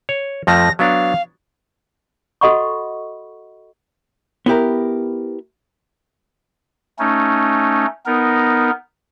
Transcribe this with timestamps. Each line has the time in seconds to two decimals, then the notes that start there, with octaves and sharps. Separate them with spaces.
0.09 C#5
0.47 F2 F3 A3 A#6
0.79 F#3 B3 D4 F5
2.41 F#4 A4 D#5 F#5 B5 C#6
4.46 B3 E4 G4 A#4
6.99 A3 C#4 D#4
8.06 B3 D#4 A#4